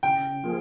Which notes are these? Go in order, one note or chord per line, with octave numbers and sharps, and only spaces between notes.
C#3 G5
F3 A#3 F4 G#4